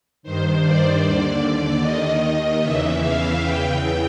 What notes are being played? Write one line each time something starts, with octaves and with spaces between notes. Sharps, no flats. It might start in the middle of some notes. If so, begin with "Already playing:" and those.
G2 D#3 C5
D5
D#2 D3 D5
D#2 D#3 D#5
D#5
E2 C#3 E3 E5
F5
E2 C#3 E3 G5